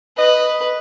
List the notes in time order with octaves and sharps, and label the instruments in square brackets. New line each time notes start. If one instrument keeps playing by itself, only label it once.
[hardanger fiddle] B4 [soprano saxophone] D#5